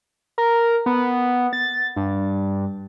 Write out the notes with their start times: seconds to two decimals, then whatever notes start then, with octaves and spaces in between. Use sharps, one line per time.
0.38 A#4
0.86 B3
1.53 A6
1.96 G2